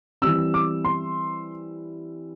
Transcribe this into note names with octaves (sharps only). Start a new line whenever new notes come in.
E3 G3 C4 E6
D6
C6